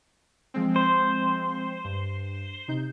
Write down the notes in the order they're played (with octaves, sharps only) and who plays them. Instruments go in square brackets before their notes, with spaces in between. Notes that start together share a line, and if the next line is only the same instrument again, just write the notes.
[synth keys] F3 G#3 C4
[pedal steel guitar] C5
[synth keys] G2
C3 D#4 G6